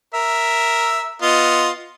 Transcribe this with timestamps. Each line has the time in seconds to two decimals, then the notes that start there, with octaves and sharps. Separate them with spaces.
0.14 A#4 E5
1.22 B3 F4 D#5